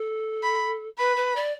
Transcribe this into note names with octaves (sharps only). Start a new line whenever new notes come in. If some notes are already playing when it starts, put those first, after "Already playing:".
Already playing: A4
B5
B4 B5
B4
D5